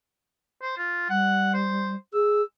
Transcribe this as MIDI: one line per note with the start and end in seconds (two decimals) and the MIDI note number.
0.62 0.73 72
0.77 1.07 65
1.09 1.95 55
1.09 1.50 78
1.54 1.94 72
2.14 2.42 68
2.14 2.43 88